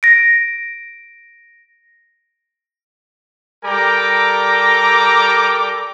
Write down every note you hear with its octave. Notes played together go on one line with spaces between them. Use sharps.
A#6 D7
G3 A4 A#4 G5 A#5 D6